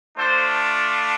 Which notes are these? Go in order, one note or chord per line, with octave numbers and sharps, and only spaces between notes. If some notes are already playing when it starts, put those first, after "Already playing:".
A3 D4 F4 A4 C5